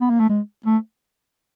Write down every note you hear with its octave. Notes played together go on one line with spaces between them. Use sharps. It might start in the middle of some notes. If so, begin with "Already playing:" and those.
B3
A#3
A3
G#3
A3